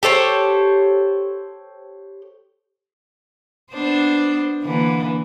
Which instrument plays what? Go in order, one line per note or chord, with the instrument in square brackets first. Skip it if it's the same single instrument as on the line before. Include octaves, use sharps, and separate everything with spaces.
[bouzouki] G4 A4 C5 C#5
[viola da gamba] B3 D4 C5
D3 E3 A#3